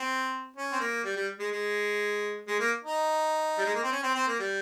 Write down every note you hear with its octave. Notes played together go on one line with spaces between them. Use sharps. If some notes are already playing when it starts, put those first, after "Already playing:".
Already playing: C4
C#4
C4
A#3
G3
G3
G#3
G#3
G#3
A#3
D#4
G3
G#3
A#3
C4
C#4
C4
C4
A#3
G3